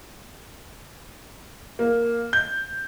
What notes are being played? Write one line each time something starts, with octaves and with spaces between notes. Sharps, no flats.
A#3
G6